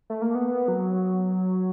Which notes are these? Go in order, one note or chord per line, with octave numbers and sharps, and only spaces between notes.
A3
A#3
B3
F#3